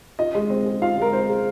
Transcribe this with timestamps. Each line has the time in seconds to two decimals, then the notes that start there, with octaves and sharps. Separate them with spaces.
0.19 F4 D#5
0.35 G#3
0.50 C4
0.66 G#4
0.82 F4 F5
0.98 G#3 A#4
1.12 C4 C5
1.29 G#4